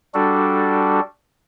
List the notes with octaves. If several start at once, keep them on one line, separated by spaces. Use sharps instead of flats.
G3 D4 F#4 A4